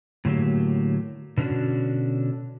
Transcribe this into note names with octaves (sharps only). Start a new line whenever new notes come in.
A2 D3 F#3 A#3 G4
B2 D3 C#4 D4 F#4